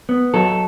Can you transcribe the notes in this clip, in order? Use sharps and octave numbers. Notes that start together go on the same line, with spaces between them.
B3
F#3 A4